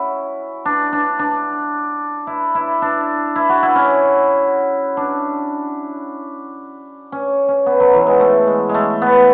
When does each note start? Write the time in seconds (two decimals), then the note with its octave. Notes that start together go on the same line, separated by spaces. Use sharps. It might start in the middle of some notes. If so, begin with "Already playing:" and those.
Already playing: C#4 E4 F#4
0.65 D4
0.92 D4
1.19 D4
2.27 E4
2.55 E4
2.82 D4
3.36 E4
3.49 F#4
3.63 E4
3.75 C#4
4.97 D4
7.12 C#4
7.49 C#4
7.66 B3
7.80 F#3
7.94 E3
8.07 G#3
8.20 A3
8.47 G#3
8.69 G#3
8.74 A3
9.02 B3